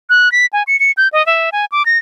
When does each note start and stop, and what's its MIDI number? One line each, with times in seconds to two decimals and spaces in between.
0.10 0.32 90
0.32 0.46 95
0.53 0.63 80
0.67 0.79 97
0.80 0.92 97
0.97 1.08 91
1.13 1.25 75
1.26 1.50 76
1.52 1.65 80
1.72 1.85 86
1.86 1.98 94